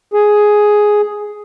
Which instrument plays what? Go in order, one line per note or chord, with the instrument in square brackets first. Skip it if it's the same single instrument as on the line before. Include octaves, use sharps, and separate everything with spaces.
[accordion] G#4